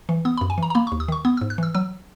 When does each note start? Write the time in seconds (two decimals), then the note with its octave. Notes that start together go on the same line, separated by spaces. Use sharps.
0.09 E3
0.25 B3 D#6
0.37 B5
0.41 F#2
0.50 G#5
0.58 E3 A#5
0.70 A#5
0.75 A#3 B5
0.87 C#6
0.92 D#2
1.00 D#6
1.08 D#3 C#6
1.25 B3 D#6
1.37 E6
1.41 G#2
1.50 F#6
1.58 E3 E6
1.75 F#3 E6